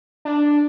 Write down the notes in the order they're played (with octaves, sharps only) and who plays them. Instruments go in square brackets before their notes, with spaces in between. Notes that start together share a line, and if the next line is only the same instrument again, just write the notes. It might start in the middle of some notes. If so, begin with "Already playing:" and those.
[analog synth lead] D4